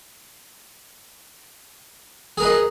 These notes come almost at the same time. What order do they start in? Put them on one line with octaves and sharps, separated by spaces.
G#4 A#4 B4 D#5